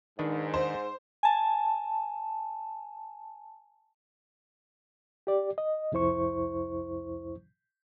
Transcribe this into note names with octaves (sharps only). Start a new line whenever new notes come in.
G#2 D#3 D4 B4
C5
G#5 A5
G4 D5
D#5
C2 F2 E4 C5 C#6